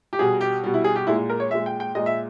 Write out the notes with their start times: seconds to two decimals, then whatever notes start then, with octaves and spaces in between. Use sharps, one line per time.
0.13 G4
0.19 B2 G3 G#4
0.41 G4
0.64 B2 G3
0.74 E4
0.84 G#4
0.96 G4
1.07 A#2 G#3 E4
1.30 A#4
1.40 C#5
1.50 A#2 G#3 E5
1.66 G5
1.80 G5
1.95 A#2 G#3 D#5
2.06 E5